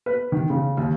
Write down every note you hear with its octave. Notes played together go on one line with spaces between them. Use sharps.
B4
D#3
C#3
D#2